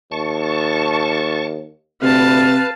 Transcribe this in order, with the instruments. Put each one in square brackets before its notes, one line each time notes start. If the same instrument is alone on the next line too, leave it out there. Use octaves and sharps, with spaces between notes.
[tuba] D#2 [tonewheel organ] A5 C#6
[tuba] D2 [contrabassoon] C3 [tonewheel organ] B4 [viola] F5 A5